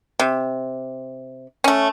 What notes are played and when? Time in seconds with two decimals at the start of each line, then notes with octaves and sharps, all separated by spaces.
0.19 C3
1.64 A3 C#4